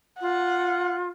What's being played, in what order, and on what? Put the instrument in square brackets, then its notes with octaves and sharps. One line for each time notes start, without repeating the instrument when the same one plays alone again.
[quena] F4 [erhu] F#5